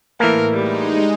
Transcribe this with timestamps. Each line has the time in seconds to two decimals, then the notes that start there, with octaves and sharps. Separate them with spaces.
0.20 A2 E3 A3 A#3 A#4
0.53 G3 G#3 D#4